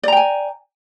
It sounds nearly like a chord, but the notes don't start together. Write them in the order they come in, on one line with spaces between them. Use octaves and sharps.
D5 A#5 G5 G#5